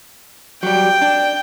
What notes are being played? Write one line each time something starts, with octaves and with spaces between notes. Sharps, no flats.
F#3 G3 G5
D4